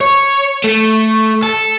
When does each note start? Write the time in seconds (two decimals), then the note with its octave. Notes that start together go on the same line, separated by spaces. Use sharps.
0.01 C#5
0.64 A3
1.43 A4